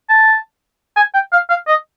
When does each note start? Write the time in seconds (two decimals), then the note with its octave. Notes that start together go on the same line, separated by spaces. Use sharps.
0.10 A5
0.97 G#5
1.14 G5
1.33 F5
1.50 F5
1.67 D#5